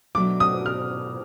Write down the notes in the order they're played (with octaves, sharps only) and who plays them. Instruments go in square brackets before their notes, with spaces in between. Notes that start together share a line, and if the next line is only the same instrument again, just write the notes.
[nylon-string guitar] B2 F#3 A3 D4 [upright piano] D6
[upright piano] D#6
F6